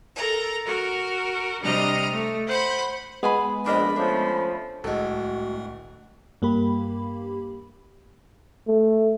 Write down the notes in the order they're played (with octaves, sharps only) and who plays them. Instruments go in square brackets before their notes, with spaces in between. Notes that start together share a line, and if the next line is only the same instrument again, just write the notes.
[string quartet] A4 A#4 A#5
F#4 A#4
C3 G3 D4 D#5 A#5 F6
A3
C5 F#5 B5
[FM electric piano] G#3 B3 [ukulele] G#4 G#5 B5
[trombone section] A#1 [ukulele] D4 A#4 D#5 [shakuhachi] B5
[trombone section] F3 A3 C#4 [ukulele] D4
[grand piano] D1 [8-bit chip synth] C2 A3 [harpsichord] G#3 A4 [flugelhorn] F#4
[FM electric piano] G2 A#3 G4 B5
[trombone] A3